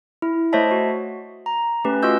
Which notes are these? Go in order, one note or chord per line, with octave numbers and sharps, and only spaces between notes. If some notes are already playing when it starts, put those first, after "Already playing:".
E4
A3 C5 C#5 D#5 E5 A5
F#4
A#5
A3 C#4 G4 B4
F4 F#4 D#5 E6 G6